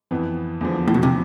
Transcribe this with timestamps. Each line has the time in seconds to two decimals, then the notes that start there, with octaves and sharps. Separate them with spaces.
0.11 F2 E3 B3
0.61 E2 D3 F3
0.88 A2
0.94 B2
1.03 C3